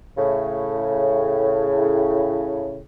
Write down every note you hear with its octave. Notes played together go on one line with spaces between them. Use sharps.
A2 C#3